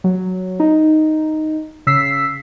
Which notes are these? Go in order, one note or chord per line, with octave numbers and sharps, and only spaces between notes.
F#3
D#4
C#3 E6 B6 C7